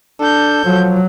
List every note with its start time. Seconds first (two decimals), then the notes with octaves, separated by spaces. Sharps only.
0.20 D4 A4 G6
0.65 F3 F#3